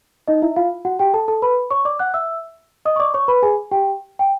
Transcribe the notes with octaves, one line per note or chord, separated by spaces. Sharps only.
D#4 D#5
E4 E5
F4 F5
F#4 F#5
G4 G5
A4 A5
A4 A5
B4 B5
C#5 C#6
D5 D6
F#5 F#6
E5 E6
D#5 D#6
C#6
D5 D6
C#5 C#6
B4 B5
G#4 G#5
G4 G5
G5